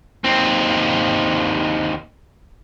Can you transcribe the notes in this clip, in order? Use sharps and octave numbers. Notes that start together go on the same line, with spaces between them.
D#2 C4